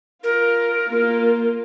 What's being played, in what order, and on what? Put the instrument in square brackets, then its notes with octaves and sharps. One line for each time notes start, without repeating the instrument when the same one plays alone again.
[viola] F4 [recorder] A#4
[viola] A#3 F4